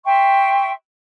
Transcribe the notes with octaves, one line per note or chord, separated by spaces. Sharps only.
E5 G5 C6 C#6